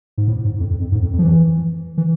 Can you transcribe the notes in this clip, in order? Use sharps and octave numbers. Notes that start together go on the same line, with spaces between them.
G#2
A2
G#2
F2
F2
F2
G#2
F2
F2
F3
E3
E3